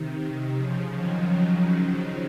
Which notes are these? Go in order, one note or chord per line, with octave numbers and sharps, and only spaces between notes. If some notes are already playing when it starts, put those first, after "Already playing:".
Already playing: C3 D#3
C3 D#3
C#3 F3
D#3 F#3